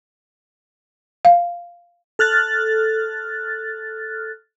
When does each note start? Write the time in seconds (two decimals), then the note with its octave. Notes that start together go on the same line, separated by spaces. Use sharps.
1.25 F5
2.19 A4 F6 F#6 A6